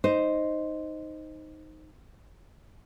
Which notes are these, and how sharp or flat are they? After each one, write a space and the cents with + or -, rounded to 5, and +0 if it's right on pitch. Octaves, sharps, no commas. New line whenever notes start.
D#4 +0 C5 +0